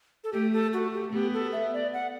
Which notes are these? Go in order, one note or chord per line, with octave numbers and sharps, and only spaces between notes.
A4
A3 G4
A4
F#4
G4
B3 G4
A4
E5
D5
F#5